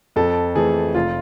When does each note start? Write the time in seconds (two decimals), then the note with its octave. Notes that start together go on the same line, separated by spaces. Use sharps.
0.16 F2 A4
0.56 E3 A3 G#4
0.95 F1 F4